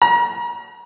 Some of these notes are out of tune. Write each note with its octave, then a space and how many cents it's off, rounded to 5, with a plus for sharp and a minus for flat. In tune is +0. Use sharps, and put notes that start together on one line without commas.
A#5 +35